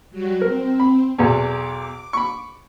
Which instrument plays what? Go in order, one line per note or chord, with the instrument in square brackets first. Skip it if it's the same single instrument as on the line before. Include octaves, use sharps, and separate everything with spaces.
[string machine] F#3 G3 F#4
[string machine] C4 [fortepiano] A#4
[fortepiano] B5
[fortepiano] B1 E2 [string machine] D6
[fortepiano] B5 C#6